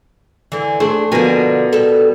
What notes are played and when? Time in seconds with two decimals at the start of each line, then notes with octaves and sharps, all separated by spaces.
0.52 D3 E3
0.80 A3 D4 G#4 C5
1.12 B2 D3 F3 A#4 G#5
1.73 G3 A4